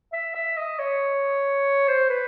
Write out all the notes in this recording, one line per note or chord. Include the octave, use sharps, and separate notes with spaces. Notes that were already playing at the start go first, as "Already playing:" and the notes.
E5
E5
D#5
C#5
C5
B4